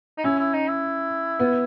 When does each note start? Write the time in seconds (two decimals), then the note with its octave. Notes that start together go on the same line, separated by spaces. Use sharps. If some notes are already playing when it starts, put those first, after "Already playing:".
0.18 D#4
0.24 C#4 E4
0.39 E4
0.53 D#4
0.68 E4
1.40 B3